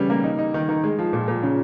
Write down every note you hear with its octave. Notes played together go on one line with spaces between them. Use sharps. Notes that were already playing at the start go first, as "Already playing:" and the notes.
Already playing: C#3 E3 G3 C#4
A#3
D#4
D#4
D#3
D#3
G#3
F3
A#2
A#2
C#3